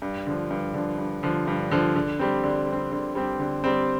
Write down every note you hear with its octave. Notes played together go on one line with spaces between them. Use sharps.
G2
D3 F3
G2
D3 F3
G2
D3 F3
G2
D3 F3
D3
G3 C4
D3
G3
C4
D3
G3 C4
D3
G3 C4